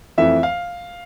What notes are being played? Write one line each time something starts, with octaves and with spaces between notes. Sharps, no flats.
F2 E3 A3 E5
F5